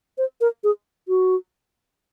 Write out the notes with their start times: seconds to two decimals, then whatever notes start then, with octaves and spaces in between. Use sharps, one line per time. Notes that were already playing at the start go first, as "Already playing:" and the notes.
0.18 C5
0.41 A#4
0.64 G#4
1.08 F#4